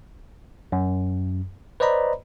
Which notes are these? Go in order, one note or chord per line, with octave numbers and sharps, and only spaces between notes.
F#2
B4 C5 D5 D#5 A#5 B5